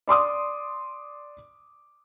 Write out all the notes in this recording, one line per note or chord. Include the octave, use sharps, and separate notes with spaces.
D5 C6 D6 D#6